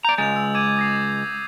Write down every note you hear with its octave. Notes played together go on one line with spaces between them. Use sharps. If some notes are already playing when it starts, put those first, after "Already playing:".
D5 A#5 G6
C#2 G#3 A6 F7
E6
D6 G#6 D#7
D#6 A#6 C7